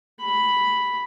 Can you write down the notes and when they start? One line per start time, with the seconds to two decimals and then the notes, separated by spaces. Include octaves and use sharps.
0.21 B5